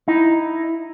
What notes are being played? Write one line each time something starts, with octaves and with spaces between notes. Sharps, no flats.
D#4 E4